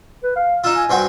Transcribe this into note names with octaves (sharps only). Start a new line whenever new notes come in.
B4
F5
D#4 F4 E6
G#5
G2 C4 F#4